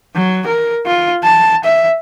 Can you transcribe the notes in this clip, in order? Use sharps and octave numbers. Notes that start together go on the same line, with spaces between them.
F#3
A#4
F4
A5
E5